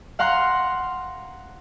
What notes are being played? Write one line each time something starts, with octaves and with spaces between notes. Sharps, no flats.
F5 F#5 A#5 C6 F#6